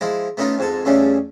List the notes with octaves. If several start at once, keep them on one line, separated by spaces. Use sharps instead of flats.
F3 G#3 E4
A3 B3 C#4 D#4 F4
F2 G#2 A4
E2 C#3 G3 A3 C#4